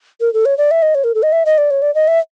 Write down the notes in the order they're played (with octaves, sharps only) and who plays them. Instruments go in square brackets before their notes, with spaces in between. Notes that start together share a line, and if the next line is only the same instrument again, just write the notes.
[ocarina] A#4
A4
C#5
D5
E5
D#5
C#5
A#4
A4
D#5
E5
D#5
D5
C#5
D5
D#5
E5